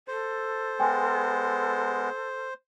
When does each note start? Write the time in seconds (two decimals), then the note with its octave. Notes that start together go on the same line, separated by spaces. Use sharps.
0.08 A4 C5
0.80 G#3 B3 G5 G#5 C6